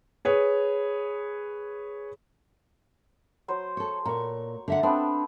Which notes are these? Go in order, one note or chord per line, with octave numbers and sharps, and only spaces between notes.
G#4 B4 C#5
F#3 C5
A4 C#5
A#2 A#5 C#6
D3 E5 F#5
B3 C4 D4 A4